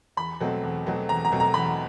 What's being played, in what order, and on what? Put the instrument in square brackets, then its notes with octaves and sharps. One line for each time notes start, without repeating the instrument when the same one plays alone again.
[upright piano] E2 B5
B2 F#3 A3 C4
E2
B2 F#3 A3 C4
E2 A#5
A#5
B2 F#3 A3 C4
A#5
E2 B5